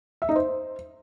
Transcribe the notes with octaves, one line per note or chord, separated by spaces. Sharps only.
E5
D#4
C5